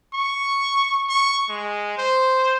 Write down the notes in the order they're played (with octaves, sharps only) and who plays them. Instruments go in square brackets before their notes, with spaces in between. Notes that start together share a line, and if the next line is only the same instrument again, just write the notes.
[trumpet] C#6
C#6
G#3
C5